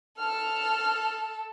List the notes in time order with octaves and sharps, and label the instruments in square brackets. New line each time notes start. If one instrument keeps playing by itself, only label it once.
[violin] A4 [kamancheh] F6